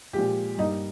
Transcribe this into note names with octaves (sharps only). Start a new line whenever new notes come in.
A#2 F3 G#3 G4
G2 G3 A#3 D#4